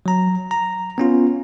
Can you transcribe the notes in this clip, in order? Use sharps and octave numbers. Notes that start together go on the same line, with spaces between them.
F#3 A#5
A#5
B3 C#4 F4